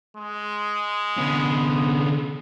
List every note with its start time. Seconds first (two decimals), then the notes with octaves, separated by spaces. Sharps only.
0.17 G#3
1.17 D3 B3 C#4